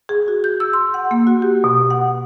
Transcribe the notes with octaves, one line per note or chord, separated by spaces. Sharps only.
G#4
F#4
G6
E6
C6
F#5
A#3
F#4
G4
B2
F#5